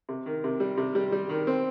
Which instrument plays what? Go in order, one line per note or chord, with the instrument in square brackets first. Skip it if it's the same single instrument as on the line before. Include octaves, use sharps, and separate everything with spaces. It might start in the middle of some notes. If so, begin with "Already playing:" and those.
[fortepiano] C3
D#3
C3
G3
C3
G3
G3
D#3
C4